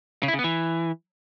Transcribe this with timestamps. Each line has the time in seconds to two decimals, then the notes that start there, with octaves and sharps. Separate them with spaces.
0.23 C#3
0.28 E4
0.34 C#3
0.39 B3
0.44 E3